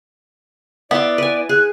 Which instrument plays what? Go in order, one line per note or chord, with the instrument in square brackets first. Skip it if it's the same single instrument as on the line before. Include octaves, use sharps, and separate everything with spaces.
[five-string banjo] B3 [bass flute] E4 [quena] D5 [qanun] E5 C6
[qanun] B4 G#5
[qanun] G#4 [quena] F#6